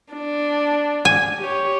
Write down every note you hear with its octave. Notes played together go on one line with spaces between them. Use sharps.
D4
G#5
G4 C#5